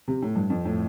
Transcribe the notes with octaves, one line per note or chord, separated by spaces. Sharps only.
C3
A2
G2
F2
A2